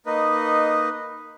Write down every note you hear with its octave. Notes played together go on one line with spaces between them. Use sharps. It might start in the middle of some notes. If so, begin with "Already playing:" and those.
A#3 D#4 B4 D#5